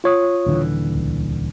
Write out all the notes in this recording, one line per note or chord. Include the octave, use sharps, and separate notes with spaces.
F4 C#5 D#6
D#1 D3 E3
C#2